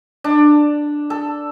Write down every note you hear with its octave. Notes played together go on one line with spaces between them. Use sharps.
D4
A4